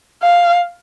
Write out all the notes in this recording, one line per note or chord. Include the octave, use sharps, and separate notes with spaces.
F5